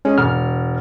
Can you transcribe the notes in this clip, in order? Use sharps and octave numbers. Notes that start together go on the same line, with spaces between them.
G#3 C#4
E1 F6